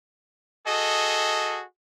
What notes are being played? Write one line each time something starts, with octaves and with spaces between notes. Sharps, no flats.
F#4 G#4 A4 D#5